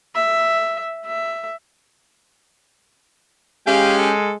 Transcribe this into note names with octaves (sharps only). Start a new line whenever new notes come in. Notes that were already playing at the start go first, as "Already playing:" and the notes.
E5
E5
G#3 C#4 G4 F5
A4